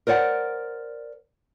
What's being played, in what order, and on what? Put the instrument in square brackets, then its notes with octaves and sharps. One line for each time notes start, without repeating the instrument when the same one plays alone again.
[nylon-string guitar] A#4 C5 D5 F#5